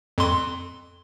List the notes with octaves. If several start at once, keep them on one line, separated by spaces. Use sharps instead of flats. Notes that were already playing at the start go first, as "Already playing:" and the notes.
F2 C6